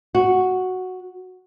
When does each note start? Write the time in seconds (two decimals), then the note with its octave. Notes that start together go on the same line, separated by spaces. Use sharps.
0.15 F#4